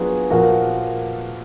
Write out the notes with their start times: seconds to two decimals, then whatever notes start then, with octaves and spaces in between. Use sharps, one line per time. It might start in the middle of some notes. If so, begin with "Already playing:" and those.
Already playing: F#3 B3 D4 F4 G#4
0.30 A#2 F3 A#3 F#4 A#4